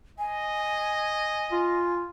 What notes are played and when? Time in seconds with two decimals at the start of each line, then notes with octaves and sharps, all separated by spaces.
0.18 D#5 G#5
1.52 F4